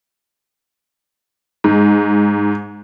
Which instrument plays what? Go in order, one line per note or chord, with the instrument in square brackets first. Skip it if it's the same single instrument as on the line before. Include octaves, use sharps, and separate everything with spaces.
[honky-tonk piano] G#2 [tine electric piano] G#3